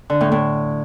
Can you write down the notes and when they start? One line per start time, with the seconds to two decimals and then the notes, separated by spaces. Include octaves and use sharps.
0.10 D3
0.21 A2
0.32 A2